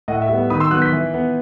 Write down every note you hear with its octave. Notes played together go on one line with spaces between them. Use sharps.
A2 D#5 F#5
E5
G3 B3
D#3 B5 D#6
C6 E6
F#3 B3 D#6 F#6
G6 B6
E3
B3